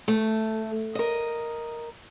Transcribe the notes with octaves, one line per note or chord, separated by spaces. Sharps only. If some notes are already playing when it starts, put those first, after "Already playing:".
A3
A#4 D#5